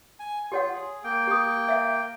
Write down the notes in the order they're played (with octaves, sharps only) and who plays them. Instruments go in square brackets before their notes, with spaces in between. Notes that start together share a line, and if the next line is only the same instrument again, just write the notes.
[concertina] G#5
[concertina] F4 [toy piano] G4 C#5 F#5
[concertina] G#4
A#3 G5
[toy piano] G4 D#6
E5 F5